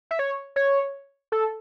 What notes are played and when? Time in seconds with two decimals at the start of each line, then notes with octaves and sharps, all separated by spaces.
0.11 E5
0.19 C#5
0.56 C#5
1.32 A4